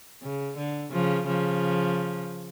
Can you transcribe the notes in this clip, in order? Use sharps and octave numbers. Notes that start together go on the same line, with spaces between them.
C#3
D3
C#3 F3
C#3 F3